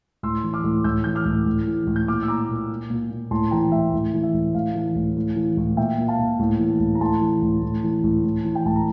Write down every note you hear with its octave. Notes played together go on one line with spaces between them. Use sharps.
A2 C6 E6
E3
D6 F6
A2
A2 E6 G6
E3 G6
D6 F6
A2
A2
E3
A2
G6
A#2 D6 F6
E6
A#2 A#5 D6
A#2
A#2
A#2
A#2
A2 A5 C6
E3 G5 A#5
A2 E5 G5
A2
E3
E5
A2
A2 F5
E3
A2
A2
E3
A2
A#2 E5 G5
A#2
F5 A5
A#2
A2
E3
A2
A#5
A2 A5 C6
E3
A2
A2
E3
A2
A2
E3
G5
A2 A5
A#5